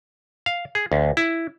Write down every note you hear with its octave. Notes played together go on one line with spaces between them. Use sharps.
F5
G#4
D2
E4